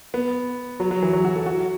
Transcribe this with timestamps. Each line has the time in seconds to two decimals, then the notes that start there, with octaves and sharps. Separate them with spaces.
0.14 B3
0.80 F#3
0.91 F#3
1.02 E3
1.13 F#3
1.25 F#4
1.36 A4
1.46 F#4